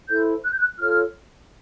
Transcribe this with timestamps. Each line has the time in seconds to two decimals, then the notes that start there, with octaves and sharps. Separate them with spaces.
0.09 E4 A4 C5 G6
0.44 F#6
0.52 G6
0.59 F#6
0.78 F4 A4 C#5 F6